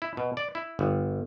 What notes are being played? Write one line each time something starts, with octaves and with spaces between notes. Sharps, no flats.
E4
B2
D5
E4
G1